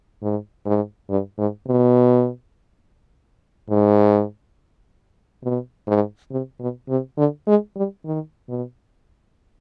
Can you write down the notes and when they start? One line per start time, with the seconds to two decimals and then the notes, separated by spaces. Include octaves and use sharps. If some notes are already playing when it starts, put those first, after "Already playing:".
0.22 G#2
0.66 G#2
1.09 G2
1.38 G#2
1.67 B2
3.70 G#2
5.43 B2
5.87 G#2
6.31 C3
6.60 B2
6.89 C3
7.17 D3
7.47 G#3
7.76 G3
8.05 D#3
8.49 B2